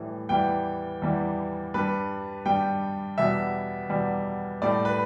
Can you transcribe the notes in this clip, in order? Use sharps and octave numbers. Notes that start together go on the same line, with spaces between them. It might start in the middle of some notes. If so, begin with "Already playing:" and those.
Already playing: A2 E3 G3
E2 E3 G3 G5
E2 E3 G3
G2 G3 B4
G2 G3 G5
E2 B2 G3 E5
E2 B2 G3
A2 G3 D5
B4